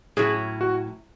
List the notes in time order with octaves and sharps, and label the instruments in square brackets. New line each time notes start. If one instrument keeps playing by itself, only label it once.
[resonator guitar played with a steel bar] A2 F#3 C#4 E4 [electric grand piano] G#4
[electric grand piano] F#4